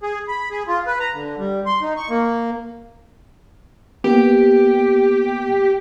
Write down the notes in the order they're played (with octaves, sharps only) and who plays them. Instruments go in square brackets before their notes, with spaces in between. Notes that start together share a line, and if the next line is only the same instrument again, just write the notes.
[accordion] G#4
B5
G#4
F4
B4
A#5
D3
G3
C6
D#4
C#6
A#3
[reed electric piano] A#3 B3 [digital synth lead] G4